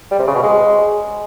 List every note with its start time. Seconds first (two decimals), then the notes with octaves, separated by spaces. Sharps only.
0.11 G3
0.19 C3
0.27 C#3
0.35 B2
0.43 G#3